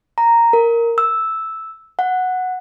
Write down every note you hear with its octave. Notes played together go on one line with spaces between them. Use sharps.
A#5
A#4
E6
F#5